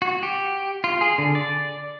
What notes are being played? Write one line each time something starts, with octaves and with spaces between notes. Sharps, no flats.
F#4
G4
F4
G#4
D3
D5